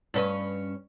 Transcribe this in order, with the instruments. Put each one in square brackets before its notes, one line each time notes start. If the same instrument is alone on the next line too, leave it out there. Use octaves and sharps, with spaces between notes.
[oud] G2 C#4 B4